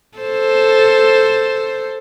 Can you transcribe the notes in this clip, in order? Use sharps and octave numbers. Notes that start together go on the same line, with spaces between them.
A4 C5